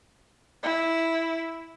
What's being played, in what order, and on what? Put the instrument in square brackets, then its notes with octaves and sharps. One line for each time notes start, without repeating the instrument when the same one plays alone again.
[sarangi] E4